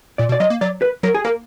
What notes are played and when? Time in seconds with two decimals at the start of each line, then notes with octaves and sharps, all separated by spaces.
0.18 A#2 D5
0.29 B2
0.32 D5
0.40 F#3 D#5
0.50 A#3
0.61 F#3 D5
0.82 B4
1.03 F#3 A#4
1.15 G#4
1.24 A#3 A#4